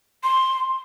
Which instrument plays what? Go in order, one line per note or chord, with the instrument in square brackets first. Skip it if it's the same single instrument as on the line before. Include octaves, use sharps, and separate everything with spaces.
[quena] C6